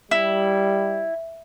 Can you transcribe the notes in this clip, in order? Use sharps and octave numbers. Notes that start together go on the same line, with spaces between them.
G3 E4